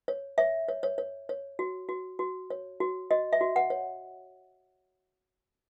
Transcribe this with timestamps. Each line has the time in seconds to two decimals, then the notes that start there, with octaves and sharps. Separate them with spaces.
0.08 C#5
0.38 C#5 E5
0.68 C#5
0.83 C#5
0.98 C#5
1.29 C#5
1.59 F#4
1.89 F#4
2.19 F#4
2.50 C#5
2.80 F#4
3.11 F#4 D#5
3.33 E5
3.41 F#4
3.56 F#5
3.70 C#5